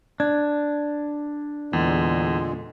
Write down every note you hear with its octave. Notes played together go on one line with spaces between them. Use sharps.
D4 G#6
E2 A#2 D3 G#3